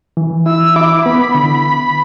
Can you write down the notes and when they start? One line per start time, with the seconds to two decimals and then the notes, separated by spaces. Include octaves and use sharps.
0.17 E3
0.46 E4 E6
0.76 E4 D6
1.06 B3 B5
1.35 D3